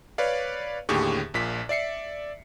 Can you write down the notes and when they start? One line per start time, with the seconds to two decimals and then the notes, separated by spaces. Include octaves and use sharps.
0.18 B4 C#5 D5 F5
0.89 D#2 A2 D3 G4 G#4 C#6
1.34 A#1 A#2 B6
1.69 D5 E5 C7 C#7